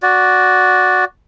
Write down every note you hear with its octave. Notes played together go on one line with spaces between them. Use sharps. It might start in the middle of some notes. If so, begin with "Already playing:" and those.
F#4 D5